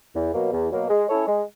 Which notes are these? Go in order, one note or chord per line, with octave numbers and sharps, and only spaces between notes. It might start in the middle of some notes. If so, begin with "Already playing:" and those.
E2
B2 F#3 A#3
E2
B2 F#3 A#3
G#3
C#4 E4 A4 C#5
G#3